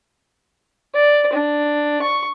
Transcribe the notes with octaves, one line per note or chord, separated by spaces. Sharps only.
D5
D4
C#6